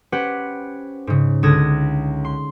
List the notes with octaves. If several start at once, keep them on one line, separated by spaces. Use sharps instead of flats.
C#4 G4 B4 C5 F#5
G#2 C#3
C#2 D3 D#6 G#6 A#6 E7
C6